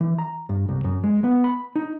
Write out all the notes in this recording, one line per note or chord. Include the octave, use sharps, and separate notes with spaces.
E3
A#5
G2
C2
F#2
G#3
B3
B5
D#4